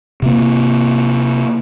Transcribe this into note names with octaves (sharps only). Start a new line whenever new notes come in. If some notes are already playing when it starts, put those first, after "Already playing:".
C3 A#3